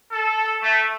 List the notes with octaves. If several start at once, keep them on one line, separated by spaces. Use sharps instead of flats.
A4
A3